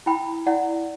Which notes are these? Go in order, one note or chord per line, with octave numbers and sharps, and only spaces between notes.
E4 G5 B5
E4 D5 F#5